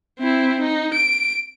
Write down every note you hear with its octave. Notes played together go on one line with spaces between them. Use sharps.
C4 E4
D#4
D7